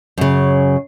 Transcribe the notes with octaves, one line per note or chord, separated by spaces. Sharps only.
F#2 C#3